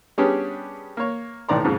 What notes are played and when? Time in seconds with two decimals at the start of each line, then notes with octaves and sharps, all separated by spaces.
0.18 G3 B3 C#4 D4 G4 G#4
0.97 A#3 C#5
1.49 B1 A2 D#3 D5 A#5 C6
1.64 F2 G#2 C#3 F3